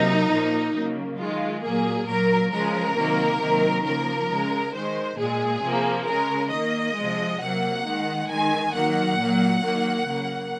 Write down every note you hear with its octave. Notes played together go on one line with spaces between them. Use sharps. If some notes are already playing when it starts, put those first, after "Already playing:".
Already playing: C3 F#3 A#3 D#4
A#2 F3 A#3
C#3 F#3 A#3
D#3 G#3 F4
A#2 F#3 A#3 G#4
A#2 F#3 A#3 A#4
C#3 F3 G#3 A#4
C3 D#3 F#3 A#3
C3 D#3 F#3 A#3
C#3 F3 A#3 A#4
C#3 G#3
D#3 G#3 C5
A#2 G#3 G#4
C3 F3 A#3
C#3 G#3 A#4
D#3 A#3 D#5
C3 F3 G#3
C3 F#3 A#3 F#5
D#3 G#3
D#3 G#3 G#5
D#3 F#3 A#3 F#5
A#2 F#3 A#3
D#3 F#3 A#3
C#3 F#3 A#3